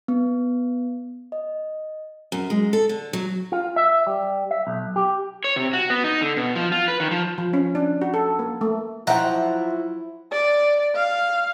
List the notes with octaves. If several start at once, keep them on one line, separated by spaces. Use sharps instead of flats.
B3
D#5
F#2
G#3
A4
D3
F#3
F4
E5
G3
E5
B1
G4
C#5
C3
F#4
B3
D#4
D3
B2
F3
F4
B4
D#3
F3
F3
C#4
D4
F#4
A4
A#3
A3
F3 F#3 E4 E5 F#5 G5 A#5
D5
F5